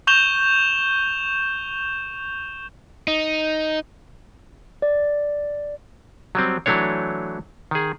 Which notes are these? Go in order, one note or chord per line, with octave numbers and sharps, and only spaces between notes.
C#6 G6 E7 F7 G7
D#4
D5
F#3 G3 C4
E3 F#3 A3 D4 C#5
D#3 G#4